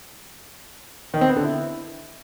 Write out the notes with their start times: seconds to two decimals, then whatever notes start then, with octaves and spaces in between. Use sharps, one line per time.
1.14 D#3
1.21 C4
1.29 B3
1.36 D3
1.44 E4